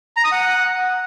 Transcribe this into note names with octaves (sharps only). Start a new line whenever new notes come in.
A#5
D#6
F#5